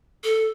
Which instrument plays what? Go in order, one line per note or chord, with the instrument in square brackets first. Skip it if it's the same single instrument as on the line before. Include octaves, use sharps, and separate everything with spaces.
[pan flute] A4